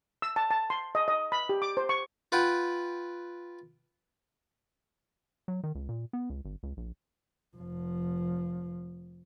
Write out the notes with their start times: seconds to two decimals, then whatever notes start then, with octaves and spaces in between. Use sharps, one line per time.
0.22 E6
0.36 A5
0.50 A5
0.70 C6
0.95 D#5
1.08 D#5
1.32 B5
1.49 G4
1.62 D6
1.77 C5
1.89 C#6
2.32 F4 B4 F#5 G5
5.48 F#3
5.63 D#3
5.75 C#2
5.89 A#2
6.13 B3
6.30 C#2
6.45 G1
6.63 C#2
6.77 A#1
7.57 F1 F3